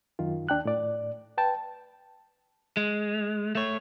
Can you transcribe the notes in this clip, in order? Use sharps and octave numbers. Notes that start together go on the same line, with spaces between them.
F#2 D#3 F4
D#2 D4 G5 F#6
A2 D5
B4 G5 A5
G#3
A3 C#5